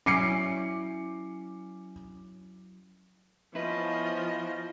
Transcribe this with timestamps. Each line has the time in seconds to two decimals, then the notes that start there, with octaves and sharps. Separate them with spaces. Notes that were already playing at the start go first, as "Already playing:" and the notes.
0.06 F#3 C#4 E4 D5 D6 C7 C#7
3.55 F3 B3 C#4 E4 F4 B4 D#5